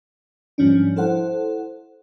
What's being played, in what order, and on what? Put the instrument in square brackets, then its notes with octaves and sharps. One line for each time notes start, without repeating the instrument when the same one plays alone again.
[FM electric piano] G#2 F3 G3 C#4 D4
E4 A4 C5 F#5